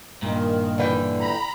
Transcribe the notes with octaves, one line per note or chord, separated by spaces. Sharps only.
G2 A#2 D#3
D3 E3 G5
A#5 B5